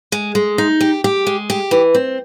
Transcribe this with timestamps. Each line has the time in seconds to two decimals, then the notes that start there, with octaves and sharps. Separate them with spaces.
0.12 G#3
0.35 G#3
0.58 D#4
0.81 G4
1.04 G4
1.27 G#3
1.50 G4
1.71 E3
1.94 C4